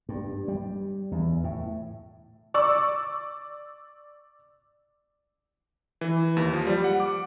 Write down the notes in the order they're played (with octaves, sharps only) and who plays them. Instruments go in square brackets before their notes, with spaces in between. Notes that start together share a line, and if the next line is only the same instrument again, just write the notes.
[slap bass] G2
G3
E2
A2
[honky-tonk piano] D5 C#6 D6 E6
[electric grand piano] E3
D#2
F3
G3
F#5
D6